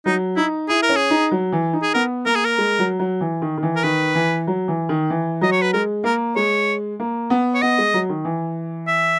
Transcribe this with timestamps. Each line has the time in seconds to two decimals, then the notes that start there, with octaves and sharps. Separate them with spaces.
0.06 F#3 D#4
0.36 D#4 E4
0.69 E4 G#4
0.83 A#4
0.89 C#4
0.96 G#4
1.10 D#4
1.31 F#3
1.52 E3
1.73 D#4
1.83 G#4
1.94 B3 A#4
2.26 A#3 A#4
2.35 G#4
2.45 A#4
2.58 G#3
2.79 F#3
2.99 F#3
3.21 E3
3.42 D#3
3.57 D#3
3.63 E3
3.76 A#4
3.83 D#3 B4
4.15 E3
4.47 F#3
4.68 E3
4.89 D#3
5.10 E3
5.41 F#3 D#5
5.52 C#5
5.62 B4
5.73 G#3 A#4
6.04 A#3 A#4
6.36 G#3 C#5
7.00 A#3
7.30 B3
7.55 C#5
7.62 B3 D#5
7.78 G#3
7.94 F#3
8.09 D#3
8.25 E3
8.88 E5